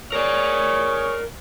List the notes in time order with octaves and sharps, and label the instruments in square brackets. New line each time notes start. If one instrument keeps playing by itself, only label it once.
[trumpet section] G#4 C#5 [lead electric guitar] A#4 D5